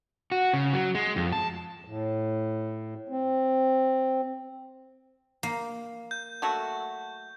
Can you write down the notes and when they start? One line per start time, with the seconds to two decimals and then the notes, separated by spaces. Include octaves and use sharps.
0.32 F#4
0.54 C#3
0.73 F#3
0.95 G#3
1.16 F2
1.33 A5
1.85 A2
3.09 C4
5.43 A#3
6.11 G6
6.42 F#3 A3 F#4